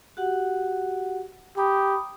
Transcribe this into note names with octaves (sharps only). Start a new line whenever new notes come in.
F#4 G4 F#5
G4 A#5 B5 D#6